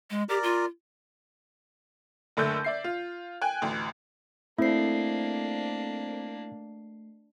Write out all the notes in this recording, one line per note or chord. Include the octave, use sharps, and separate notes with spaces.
G#3
G4 A#4 D5
F4
F#1 D3 A3 E6 G6
D5 E5 C7
F4
G5 G#5 F#6
A1 D2
A3 A#3 C4 D4 E4 A4 C5 C7